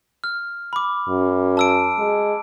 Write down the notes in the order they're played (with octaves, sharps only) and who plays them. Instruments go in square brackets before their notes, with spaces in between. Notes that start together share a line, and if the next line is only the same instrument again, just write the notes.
[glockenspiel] F6
B5 D6
[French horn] F#2
[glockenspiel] A5 E6 D7
[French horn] G#3